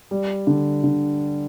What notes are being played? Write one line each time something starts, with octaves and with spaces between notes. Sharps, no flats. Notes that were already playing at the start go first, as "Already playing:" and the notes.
G3
D3
D3